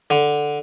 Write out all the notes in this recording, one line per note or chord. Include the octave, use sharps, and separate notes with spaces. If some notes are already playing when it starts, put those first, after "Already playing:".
D3